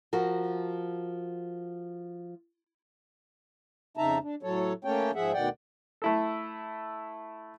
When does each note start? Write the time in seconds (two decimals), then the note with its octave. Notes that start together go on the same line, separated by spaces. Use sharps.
0.13 F3 F#4 A#4
3.97 F2 C#3 D#4 E5 A5 A#5
4.22 D4
4.43 A2 F#3 A4 C#5
4.85 A3 A#3 C#4 A4 C#5 G5
5.15 G#2 F3 G#4 E5 F#5
5.33 D2 B2 D#3 D5 F#5 G5
6.02 A3 E4 A4